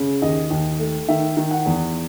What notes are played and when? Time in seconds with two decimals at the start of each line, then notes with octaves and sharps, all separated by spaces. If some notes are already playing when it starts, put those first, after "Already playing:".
Already playing: C#3
0.22 D#2 D#5
0.50 D#2
0.79 A3
1.08 D#3 E5
1.37 D#3
1.51 F#5
1.66 E2